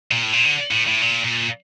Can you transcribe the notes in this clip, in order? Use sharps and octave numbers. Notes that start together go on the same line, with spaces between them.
A#2
A2
A#2
D3
A2
A2
A#2
A#2